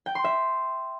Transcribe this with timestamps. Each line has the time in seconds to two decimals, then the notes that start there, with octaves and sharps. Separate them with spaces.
0.06 G5
0.15 C6
0.24 E5